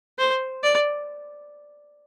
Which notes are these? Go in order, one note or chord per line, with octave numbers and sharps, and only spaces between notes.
C5
D5